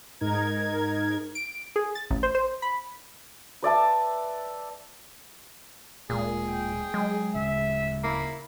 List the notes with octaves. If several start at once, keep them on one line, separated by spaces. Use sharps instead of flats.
G#2 D#4 A#4 G#6
D7
G#4
A6
A1
C5
C5
B5
B4 D5 E5 A5
D1 A#2 G#3 G#4
G5
F#3 G#3
D1 C#3 E5
A#3 E4